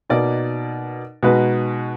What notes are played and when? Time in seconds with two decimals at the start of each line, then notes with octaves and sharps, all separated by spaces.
0.10 B2 A#3 D#4 A#4 D5
1.23 B2 G#3 D#4 F#4 B4